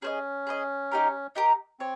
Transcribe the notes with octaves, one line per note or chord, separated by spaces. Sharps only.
C#4 G#4 C5 D#5
G#4 C5 D#5
D#4 G4 A#4
D#4 G4 A#4
C4 C#5